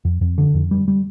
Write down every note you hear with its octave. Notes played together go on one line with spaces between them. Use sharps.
F2
F2
D3
F2
G3
G3